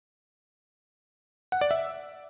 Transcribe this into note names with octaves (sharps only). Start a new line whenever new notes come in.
F#5
D5
E5